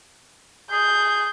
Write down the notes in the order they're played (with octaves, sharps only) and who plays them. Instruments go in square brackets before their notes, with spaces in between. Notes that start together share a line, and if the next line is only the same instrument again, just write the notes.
[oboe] G#4 [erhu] G6